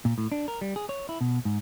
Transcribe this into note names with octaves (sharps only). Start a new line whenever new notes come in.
A#2
A2
D4
A#4
G3
G#4
C#5
E4
B2
G#2